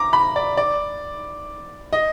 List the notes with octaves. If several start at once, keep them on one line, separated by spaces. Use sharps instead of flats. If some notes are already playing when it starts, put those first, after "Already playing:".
Already playing: A#5 D6
B5
D5
D5
D#5